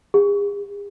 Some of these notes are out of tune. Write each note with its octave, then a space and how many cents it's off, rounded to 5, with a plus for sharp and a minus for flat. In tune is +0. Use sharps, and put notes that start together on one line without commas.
G#4 -40